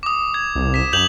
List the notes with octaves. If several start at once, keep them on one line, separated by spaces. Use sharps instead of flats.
D6 D#6
G#6
C2
B6 E7
F#2 G6 F7 F#7